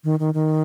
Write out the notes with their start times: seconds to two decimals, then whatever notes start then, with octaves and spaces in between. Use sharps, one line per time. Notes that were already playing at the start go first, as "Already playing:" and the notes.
0.04 D#3
0.20 D#3
0.34 D#3